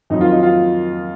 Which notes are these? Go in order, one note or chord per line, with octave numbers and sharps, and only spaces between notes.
F2 D#3 F#3 D#4
F4
D#4
F4